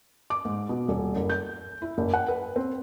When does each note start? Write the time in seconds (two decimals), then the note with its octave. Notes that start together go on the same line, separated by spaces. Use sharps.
0.30 D6
0.45 G#2
0.69 B2
0.88 D#1
1.16 F#1
1.30 G6
1.82 E4
1.98 F#1
2.14 F#5
2.28 B4
2.56 C4